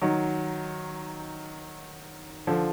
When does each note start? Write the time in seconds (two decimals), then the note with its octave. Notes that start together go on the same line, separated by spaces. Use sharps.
0.02 D#3 F#3
2.47 D3 F3